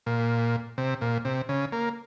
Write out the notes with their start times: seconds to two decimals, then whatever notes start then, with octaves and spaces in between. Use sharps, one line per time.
0.06 A#2
0.78 C3
1.01 A#2
1.25 C3
1.49 C#3
1.72 A#3